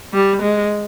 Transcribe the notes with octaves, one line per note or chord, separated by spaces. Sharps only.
G3
G#3